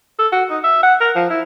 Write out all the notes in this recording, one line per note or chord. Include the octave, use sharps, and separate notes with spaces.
A4
F#4
D#4
E5
F#5
A#4
F3
E4